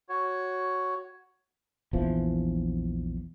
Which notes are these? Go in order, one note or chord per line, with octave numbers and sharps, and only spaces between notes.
F#4 C#5
A#1 E2 E3 F3